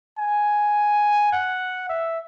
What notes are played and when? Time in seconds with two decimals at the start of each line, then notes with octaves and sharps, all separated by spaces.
0.18 G#5
1.32 F#5
1.89 E5